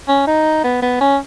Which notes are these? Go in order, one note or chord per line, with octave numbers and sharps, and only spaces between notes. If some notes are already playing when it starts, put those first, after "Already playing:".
C#4
D#4
B3
B3
C#4